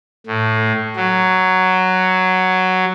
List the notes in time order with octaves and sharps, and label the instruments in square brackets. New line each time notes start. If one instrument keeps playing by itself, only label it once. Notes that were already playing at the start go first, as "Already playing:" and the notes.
[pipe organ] A2
F#3